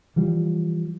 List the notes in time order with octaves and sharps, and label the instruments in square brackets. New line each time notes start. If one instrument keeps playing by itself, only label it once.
[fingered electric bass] E3 F3 G3